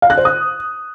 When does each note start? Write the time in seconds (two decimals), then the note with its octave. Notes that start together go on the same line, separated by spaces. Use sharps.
0.02 F5
0.10 F#6
0.17 C5
0.25 D#6